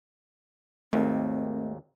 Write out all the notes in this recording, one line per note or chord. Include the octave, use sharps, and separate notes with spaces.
G#1 D#2 A3 C4